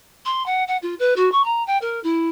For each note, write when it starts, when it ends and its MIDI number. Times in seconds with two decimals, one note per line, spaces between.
0.25 0.45 84
0.45 0.63 78
0.67 0.77 78
0.82 0.94 65
0.99 1.15 71
1.16 1.31 66
1.31 1.42 85
1.44 1.62 82
1.66 1.77 79
1.81 2.00 70
2.03 2.29 64